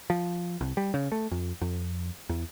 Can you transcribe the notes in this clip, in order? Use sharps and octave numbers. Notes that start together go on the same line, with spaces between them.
F3
C2
G3
C#3
A3
F2
F2
E2